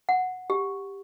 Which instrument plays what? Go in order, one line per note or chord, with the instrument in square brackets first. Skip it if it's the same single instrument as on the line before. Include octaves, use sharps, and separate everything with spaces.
[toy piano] F#5
G4